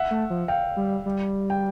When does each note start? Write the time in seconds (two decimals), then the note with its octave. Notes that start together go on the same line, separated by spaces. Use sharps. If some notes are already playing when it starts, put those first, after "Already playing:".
Already playing: E5 F#5
0.11 A3
0.30 F3
0.48 F5 G5
0.77 G3
1.06 G3
1.50 G5